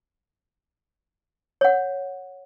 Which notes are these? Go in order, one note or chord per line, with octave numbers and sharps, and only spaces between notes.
C#5 F#5